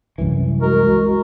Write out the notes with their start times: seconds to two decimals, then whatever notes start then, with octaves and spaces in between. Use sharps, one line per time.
0.18 C2 F#2 E3
0.62 G#3 F#4 A#4